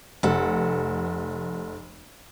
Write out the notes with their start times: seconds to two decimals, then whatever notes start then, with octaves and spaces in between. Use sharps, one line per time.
0.23 F1 A4 F#5